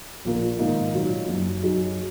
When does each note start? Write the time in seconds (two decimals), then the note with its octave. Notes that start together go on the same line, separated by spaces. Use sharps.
0.25 A#1 A#2 A#3
0.59 G#2 D#3 A#3 D#4
0.94 A#2 F#3 D#4
1.28 F#1 F#2 F#3 D#4
1.62 F#2 F#3 D#4 G#4